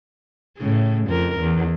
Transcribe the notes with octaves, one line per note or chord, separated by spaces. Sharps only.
A2 C#3
F2 A#4
E2